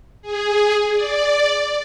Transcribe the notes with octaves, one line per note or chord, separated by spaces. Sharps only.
G#4
D5